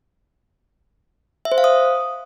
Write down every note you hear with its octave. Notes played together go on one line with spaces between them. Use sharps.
E5
C5
F5
D#6